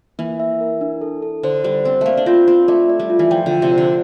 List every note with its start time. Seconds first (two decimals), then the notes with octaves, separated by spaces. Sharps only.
0.19 E3 A#3
0.40 E5
0.61 A#4
0.81 D4
1.01 A4
1.22 A4
1.43 D3 C5
1.64 G3 C5
1.85 C4 C5
2.01 A3 A#3 F5
2.17 D4
2.26 C4 F4
2.48 C4 F4
2.68 A3 D5
2.90 D5
3.00 G3
3.10 F4
3.19 E3
3.31 F3 G5
3.46 D3
3.51 G5
3.62 C3
3.73 D3 C5